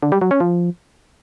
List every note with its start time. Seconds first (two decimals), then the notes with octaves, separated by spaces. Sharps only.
0.03 D3
0.12 G3
0.21 F#3
0.31 C#4
0.40 F3